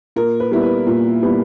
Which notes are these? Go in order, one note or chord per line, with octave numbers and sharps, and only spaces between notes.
A#2 A#4
B4
G3 B3 E4
B4
A#2
G3 B3 E4